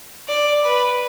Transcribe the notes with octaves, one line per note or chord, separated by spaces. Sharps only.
D5
B4